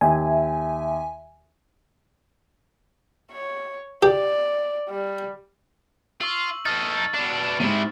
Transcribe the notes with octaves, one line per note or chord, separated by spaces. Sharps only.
D#2 E5 G#5
C#5
G4 D5
G3
F4 C#6 E6 F#7
D#4 A4 F6 A6
B2 D4
D#2 G#2 C3 E4